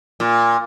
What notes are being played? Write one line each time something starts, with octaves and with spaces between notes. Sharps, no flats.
A#2